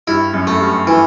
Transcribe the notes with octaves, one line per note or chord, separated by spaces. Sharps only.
G2 E4
F#2
A3
G2
E3